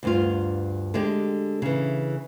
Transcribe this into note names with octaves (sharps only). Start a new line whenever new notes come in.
D2 G2 F4
D3 G#3 G4
C#3 E3